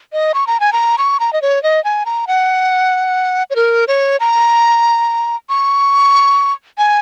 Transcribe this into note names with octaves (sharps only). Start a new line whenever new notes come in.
D#5
C#6
A#5
G#5
A#5
C#6
A#5
D#5
C#5
D#5
G#5
A#5
F#5
C#5
A#4
C#5
A#5
C#6
G#5